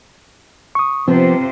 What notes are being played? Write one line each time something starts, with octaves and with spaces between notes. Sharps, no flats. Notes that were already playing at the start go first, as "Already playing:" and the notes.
C#6 D#6
C3 F3 B3 C4 F4 C5